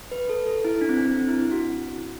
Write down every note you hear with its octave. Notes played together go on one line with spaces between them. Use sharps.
B4
A4
A4
E4
D4
C4
D4
C4
E4
F#4